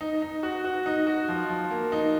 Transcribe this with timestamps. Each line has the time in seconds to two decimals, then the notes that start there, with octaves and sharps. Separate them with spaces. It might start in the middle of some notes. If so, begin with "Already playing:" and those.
0.01 D#4
0.22 D#4
0.43 F#4
0.64 F#4
0.86 D#4
1.07 F#4
1.28 F3
1.49 F3
1.71 A#3
1.92 D#4